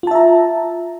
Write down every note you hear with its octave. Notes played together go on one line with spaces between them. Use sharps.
F4 E5 A5 A#5